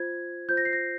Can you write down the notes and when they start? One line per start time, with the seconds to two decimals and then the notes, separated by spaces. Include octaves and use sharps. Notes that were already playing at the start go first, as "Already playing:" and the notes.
Already playing: F4 C5 G#6
0.49 F4 C5 G6
0.57 A#6
0.65 C7
0.73 A#6